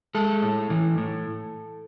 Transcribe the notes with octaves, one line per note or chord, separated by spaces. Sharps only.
G#3 A4
A2
E3
A2